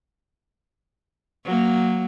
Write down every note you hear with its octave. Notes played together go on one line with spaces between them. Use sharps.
F#3 A#3